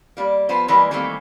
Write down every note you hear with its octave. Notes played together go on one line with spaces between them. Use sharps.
G3 A#3
F3 B3 C5
E3 G3 G#3 A#3 A#4 B4
D#3 E3 G3 A3 A#3 C4